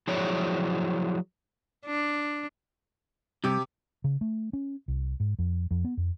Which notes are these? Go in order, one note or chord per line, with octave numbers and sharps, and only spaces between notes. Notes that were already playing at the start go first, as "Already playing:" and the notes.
F3 F#3 E4 G#4 C#5 D5
D4
C2 C3 G4 D6
C#3
A3
C#4
C2
G#2
F2
F2
B3
F2